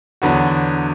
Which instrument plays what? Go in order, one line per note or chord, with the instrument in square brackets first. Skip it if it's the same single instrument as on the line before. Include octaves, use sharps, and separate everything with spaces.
[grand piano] E2 D3 F#3 B3 F#4